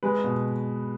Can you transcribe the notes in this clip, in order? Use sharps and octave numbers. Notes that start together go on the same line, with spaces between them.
G#3 B4
B2